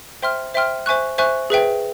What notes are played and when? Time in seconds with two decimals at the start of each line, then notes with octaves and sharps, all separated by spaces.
0.22 C5 E5 G5 C6 F6
0.54 C5 E5 G5 C6 F6
0.86 C5 E5 G#5 C#6 F#6
1.18 C5 E5 G#5 C#6 F#6
1.50 G#4 B4 E5 G5